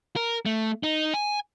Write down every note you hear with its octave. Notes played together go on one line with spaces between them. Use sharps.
A#4
A3
D#4
G#5